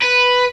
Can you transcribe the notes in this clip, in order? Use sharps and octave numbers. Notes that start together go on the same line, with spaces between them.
B4